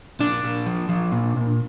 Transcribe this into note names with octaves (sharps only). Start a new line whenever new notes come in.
A#2 D4
A#2
F3
F3
A#2
A#2